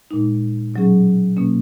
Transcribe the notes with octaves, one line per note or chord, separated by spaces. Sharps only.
A#2 G#3 D#4
B2 F#3 C#4 G#4
B2 A#3 C#4